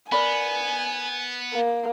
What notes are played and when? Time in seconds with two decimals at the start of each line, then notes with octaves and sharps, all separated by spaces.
0.12 B3 A#4 D5 G#5 B5
1.54 A#3